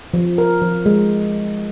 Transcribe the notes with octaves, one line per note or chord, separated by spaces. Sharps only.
F3
A#4
F3
G#3